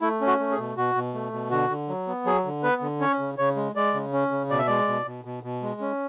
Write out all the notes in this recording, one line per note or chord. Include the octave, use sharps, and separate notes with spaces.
A3 E4
C#4
F#4
A3
G#4
B2
B2 F#4
B2
A3
B2
D3 F#4
D3
F#3
B3
F#3 G#4
D3
B3 B4
D3
C#4 C#5
C#3
C#3 C#5
G#3
G#3 D5
C#3
C#4
C#3
B2 D5
E5
G#3 D5
B2
B2
B2
B2
G#3
C#4